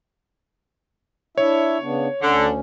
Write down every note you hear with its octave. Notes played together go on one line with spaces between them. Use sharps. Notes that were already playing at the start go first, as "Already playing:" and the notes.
D4 E4 C#5 E5
C#3 B3 D4
D2 D3 C#4